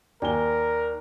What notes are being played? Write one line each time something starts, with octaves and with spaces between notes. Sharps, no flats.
D#2 A#4 D5 G#5 G7